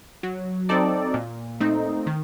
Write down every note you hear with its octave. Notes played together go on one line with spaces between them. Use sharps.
F#3
C4 D#4 A4 D5
A#2
A3 C4 D#4
D#3